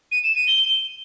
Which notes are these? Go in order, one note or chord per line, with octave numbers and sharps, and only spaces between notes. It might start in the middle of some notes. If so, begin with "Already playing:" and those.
D#7
E7
D#7
G7